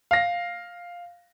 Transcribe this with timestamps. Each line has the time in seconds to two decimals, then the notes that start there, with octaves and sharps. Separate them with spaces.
0.11 F5 A#6